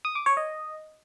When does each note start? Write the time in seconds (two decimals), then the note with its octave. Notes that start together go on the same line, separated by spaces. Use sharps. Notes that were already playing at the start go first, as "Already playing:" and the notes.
0.05 D#6
0.15 D6
0.26 C#5
0.37 D#5